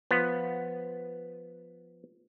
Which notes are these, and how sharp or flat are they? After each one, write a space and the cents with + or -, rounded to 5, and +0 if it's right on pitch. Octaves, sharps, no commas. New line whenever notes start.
F3 +0 B3 +0